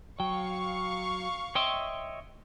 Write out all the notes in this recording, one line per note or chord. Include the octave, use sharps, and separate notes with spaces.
F#3 F5 G5 C#6
C#5 D#5 E5 G5 C6